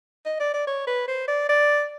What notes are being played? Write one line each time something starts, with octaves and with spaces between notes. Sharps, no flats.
D#5
D5
D5
C#5
B4
C5
D5
D5